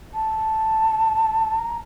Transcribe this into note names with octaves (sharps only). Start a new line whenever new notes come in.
A5
A#5